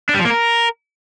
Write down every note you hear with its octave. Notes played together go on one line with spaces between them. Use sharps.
D4
G3
F3
A#3
A#4